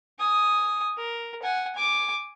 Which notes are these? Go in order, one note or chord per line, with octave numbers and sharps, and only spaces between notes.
G#5 D#6
A#4
F#5 G#5
G#5 D6